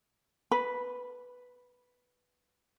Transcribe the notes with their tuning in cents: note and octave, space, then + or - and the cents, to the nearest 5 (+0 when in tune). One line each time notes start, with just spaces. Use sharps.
B4 +0 B5 -15